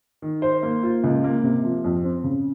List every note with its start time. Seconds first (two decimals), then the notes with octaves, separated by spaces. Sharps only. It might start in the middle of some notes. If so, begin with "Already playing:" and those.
0.22 D#3
0.42 C5
0.63 A#3
0.83 F4
1.04 C#2
1.24 A#3
1.44 C3
1.64 F3
1.84 F2
2.04 C4
2.24 C#3